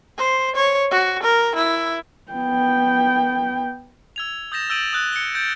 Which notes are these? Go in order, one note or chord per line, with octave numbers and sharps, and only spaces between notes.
C5
C#5
F#4
A#4
E4
B3 G5
E6 G#6 F7
D#6 G6 A6 A#6 E7
E6 G6 A6 D7 D#7 F#7
D#6 F#6
C#7 G7
G6 A6 D7